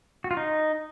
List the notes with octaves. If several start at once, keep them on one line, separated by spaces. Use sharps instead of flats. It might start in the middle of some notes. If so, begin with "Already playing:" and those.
F#4
F4
D#4